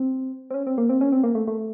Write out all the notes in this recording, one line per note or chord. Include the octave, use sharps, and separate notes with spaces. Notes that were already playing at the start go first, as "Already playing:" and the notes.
Already playing: C4
C4
C#4
C4
A#3
C4
C#4
C4
A#3
A3
A3